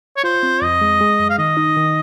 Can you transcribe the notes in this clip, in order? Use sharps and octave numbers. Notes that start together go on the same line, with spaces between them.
C#5
F4 C5
C4
F2 D#5
G#3
G#3
F#2
F5
D#3 D#5
D#4
D#3